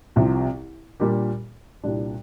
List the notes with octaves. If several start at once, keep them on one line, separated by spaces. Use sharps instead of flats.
C2 C3 F3
A#2 G3 D4 G4 A#4
C2 A#2 G3 D4